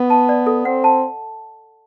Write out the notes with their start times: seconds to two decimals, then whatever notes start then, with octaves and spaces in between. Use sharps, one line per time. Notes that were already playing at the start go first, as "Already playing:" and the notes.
Already playing: B3
0.10 A5
0.29 D5
0.47 A4
0.65 C4 F#5
0.84 A5